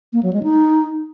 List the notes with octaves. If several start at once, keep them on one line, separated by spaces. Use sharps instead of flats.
A#3
F#3
G#3
D#4